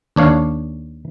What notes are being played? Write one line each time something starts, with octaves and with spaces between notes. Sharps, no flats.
D#2 D4 C#5 F5